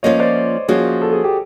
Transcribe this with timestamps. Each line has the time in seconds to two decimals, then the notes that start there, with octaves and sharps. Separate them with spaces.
0.03 F3 A#3 C#4 F4 C#5 D#5
0.19 C5 D5
0.68 F3 A#3 C#4 F4 F#4 G#4
1.02 A4
1.13 G#4
1.24 G4